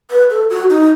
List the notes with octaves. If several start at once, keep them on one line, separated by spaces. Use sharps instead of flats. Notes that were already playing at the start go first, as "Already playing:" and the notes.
B4
A4
F#4
D#4